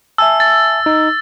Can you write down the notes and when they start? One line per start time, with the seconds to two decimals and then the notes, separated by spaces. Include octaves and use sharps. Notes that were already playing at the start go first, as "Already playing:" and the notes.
0.18 E5 G#5 A5 E6
0.40 A6
0.86 D#4